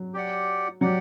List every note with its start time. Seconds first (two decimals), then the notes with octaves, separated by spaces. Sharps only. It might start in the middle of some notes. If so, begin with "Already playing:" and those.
Already playing: F#3
0.14 G4 D5 F#5
0.81 F#3 G4 D5 F#5